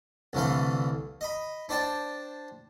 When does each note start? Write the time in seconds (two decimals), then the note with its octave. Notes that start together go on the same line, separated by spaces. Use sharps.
0.33 C2 D3 E3 A3 F5
1.21 D#5 B5
1.69 D4 C5 D5 G5 A5